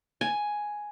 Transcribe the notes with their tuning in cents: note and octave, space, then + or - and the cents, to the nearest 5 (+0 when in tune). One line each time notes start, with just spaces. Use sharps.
G#5 +5